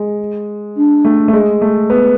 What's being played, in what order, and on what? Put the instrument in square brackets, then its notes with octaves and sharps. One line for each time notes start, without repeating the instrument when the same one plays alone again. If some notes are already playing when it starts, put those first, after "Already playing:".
Already playing: [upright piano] G#3
[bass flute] D4
[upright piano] A3
A3
G#3
A3
B3